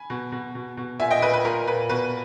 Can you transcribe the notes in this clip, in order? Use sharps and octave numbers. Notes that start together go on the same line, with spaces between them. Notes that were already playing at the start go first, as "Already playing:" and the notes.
Already playing: G#5 B5
B2
B2
B2
B2
A#2 E5 G#5
D#5 G5
A#2 B4
B4
A#2 A#4
A#2 B4
B2 B4